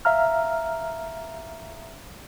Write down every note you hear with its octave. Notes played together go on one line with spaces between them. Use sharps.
E5 F5 A#5 F6